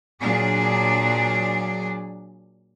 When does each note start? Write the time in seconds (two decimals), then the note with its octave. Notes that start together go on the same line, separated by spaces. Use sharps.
0.19 A#2 F#3 D4 G#4